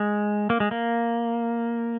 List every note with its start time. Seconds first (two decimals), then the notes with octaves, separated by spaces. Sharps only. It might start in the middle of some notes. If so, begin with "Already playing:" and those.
Already playing: G#3
0.50 A#3
0.60 G#3
0.71 A#3